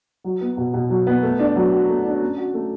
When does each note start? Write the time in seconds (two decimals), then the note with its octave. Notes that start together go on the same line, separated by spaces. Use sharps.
0.24 F#3
0.41 B3
0.57 B2
0.74 B2
0.90 F#3
1.07 B3
1.23 A3
1.39 D4
1.56 F#3
1.72 F#4
1.89 A3
2.05 D4
2.21 C#4
2.38 F#4
2.54 A3